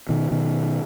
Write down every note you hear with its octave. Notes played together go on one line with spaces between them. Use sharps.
B2 D#3
B2 D#3